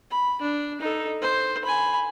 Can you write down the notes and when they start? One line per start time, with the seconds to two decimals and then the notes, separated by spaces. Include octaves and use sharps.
0.11 B5
0.42 D4
0.81 D#4 A4
1.22 C5
1.65 G#5 B5